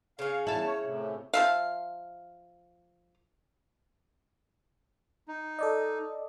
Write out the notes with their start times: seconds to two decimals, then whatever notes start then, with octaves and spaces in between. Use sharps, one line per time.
0.19 C#3 C#4 F5
0.47 E2 E4 F5 A5
0.66 C#5
0.85 A2 C3
1.33 F3 E5 F5
5.28 D#4
5.59 A4 D5 D#5